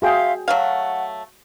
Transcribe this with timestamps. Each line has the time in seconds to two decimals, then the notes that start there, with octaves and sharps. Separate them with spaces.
0.02 F#4 G#4 E5 F5 G5 C6
0.48 F#3 A3 F5 F#5